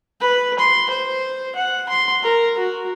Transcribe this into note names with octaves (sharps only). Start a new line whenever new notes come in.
B4
C6
C5
F#5
C6
A#4
F#4